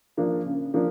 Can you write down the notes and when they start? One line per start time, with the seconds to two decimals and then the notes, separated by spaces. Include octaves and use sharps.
0.17 F3 A#3 D4
0.46 C#3
0.74 F3 A#3 D4